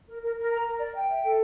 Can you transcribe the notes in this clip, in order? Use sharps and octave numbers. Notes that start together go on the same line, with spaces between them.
A#4
A#4
A#4
A#5
A#4
D5
G5
E5
A4